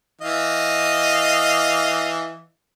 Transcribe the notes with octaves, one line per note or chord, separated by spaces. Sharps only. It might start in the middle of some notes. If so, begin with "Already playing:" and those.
E3 D#5 F5